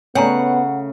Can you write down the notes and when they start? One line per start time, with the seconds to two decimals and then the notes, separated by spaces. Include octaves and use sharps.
0.15 C#3 A3 B3 C#5 F#5 G#5 A#5